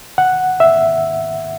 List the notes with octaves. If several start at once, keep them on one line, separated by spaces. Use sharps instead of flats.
F#5
E5